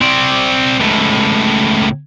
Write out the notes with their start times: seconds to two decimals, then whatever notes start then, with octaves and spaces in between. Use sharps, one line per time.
0.01 C4 D5
0.80 C#2 A2